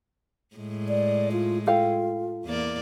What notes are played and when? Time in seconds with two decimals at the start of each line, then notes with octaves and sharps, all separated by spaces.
0.56 A2 G#3
0.89 D5
1.32 F4
1.67 F4 A4 F5 G5
2.45 E2 A#3 D5